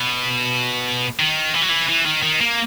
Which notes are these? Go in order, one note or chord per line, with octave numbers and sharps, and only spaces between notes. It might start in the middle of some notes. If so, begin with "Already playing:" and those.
Already playing: B2
D#3
E3
F#3
E3
E3
D#3
D#3
A#3